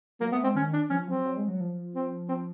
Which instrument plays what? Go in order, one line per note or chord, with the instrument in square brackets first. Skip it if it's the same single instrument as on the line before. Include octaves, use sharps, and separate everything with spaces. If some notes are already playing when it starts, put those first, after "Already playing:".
[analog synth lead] F#3 [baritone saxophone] A#3
[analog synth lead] A3 [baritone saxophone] B3
[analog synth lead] G#3 [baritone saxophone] C4
[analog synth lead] D#3 [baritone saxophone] C#4
[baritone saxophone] D4
[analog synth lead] F3 [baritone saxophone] C#4
[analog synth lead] F#3 [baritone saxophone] C4
[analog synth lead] F#3
G#3
F#3
F3
[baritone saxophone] C4
C4